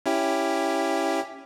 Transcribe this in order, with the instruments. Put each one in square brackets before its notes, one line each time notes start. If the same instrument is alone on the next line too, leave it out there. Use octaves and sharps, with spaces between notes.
[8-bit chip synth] C#4 E4 G4